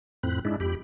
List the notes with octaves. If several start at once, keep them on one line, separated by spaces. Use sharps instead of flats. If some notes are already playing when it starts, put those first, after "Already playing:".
F2 A2 C4 B5 F#6
G#2 G#3 D4 E4
F2 G4 B5